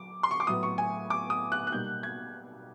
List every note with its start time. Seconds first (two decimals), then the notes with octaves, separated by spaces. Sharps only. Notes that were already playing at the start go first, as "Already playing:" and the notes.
Already playing: F#3 D6
0.23 C6
0.31 C#6
0.40 D6
0.47 A2 F#3 B3 D#6
0.63 C#6
0.78 G#5
1.10 D6
1.30 D#6
1.52 F#6
1.67 F#6
1.72 B2 G3 A#3 D#4 G6
2.03 G#6